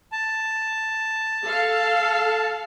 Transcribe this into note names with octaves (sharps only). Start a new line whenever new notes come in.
A5
A4 F5